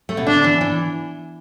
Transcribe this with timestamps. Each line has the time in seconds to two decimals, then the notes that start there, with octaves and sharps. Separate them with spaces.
0.09 A3
0.17 B2
0.27 D3 D4
0.44 E3
0.61 E3